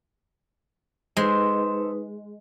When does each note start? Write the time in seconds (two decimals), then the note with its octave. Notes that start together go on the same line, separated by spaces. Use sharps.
1.17 G#3 D#4 A4 B4 C5 C6